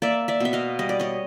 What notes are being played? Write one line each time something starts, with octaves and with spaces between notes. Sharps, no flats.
A#3 D5 E5
D5 E5
B2 E5
D#5 F5
G3 D#5
D5
C#5 D#5